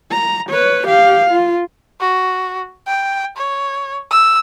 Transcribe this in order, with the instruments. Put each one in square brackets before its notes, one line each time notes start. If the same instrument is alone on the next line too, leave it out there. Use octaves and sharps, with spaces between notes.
[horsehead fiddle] A#5
B4 C#5
G4 F5
F4
[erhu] F#4
G5
C#5
E6